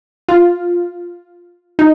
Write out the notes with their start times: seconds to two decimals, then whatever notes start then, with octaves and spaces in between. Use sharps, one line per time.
0.29 F4
1.79 D#4